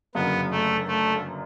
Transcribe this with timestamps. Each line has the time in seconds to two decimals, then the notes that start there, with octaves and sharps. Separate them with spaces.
0.15 G1 F#2 C#3 F#3 A#3 B3
0.51 A3
0.88 A3